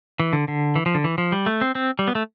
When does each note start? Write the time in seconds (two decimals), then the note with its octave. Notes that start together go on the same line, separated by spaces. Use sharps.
0.20 E3
0.33 D3
0.48 D3
0.76 E3
0.86 F3
0.95 D3
1.04 E3
1.18 F3
1.32 G3
1.46 A3
1.61 C4
1.75 C4
1.99 G3
2.08 B3
2.15 A3